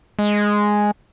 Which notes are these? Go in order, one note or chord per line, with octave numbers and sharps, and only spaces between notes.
G#3